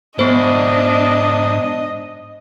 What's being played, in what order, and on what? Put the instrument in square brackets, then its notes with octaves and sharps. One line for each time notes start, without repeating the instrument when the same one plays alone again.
[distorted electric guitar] G#2 E4 [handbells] B3 C5 [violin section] D4 [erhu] D#5